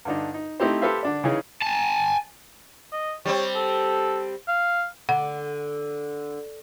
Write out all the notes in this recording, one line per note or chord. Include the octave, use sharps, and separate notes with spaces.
G2 D3 D4 D#4
D#4
A3 C4 D#4 E4 G4 C5
G4 A4 B4 C5 E5 F5
D3 D4 D5
C#3 E3 C#4 D#4 G#4
G#5 A5
D#5
G3 C4 C#5
A4
F5
D3 F#5